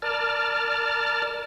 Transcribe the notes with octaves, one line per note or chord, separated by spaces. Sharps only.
A#4 D5 A5 F6